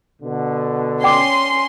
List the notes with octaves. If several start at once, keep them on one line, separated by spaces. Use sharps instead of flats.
B2 D3
C#4 D5 G5 C6 D6